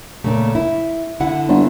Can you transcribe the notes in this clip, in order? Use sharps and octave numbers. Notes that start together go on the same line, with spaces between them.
A#2 C#3 A3
E4
D3 E4 F#5
G1